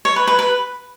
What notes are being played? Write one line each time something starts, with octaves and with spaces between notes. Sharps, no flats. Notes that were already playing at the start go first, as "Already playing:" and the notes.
C#5
B4
B4
B4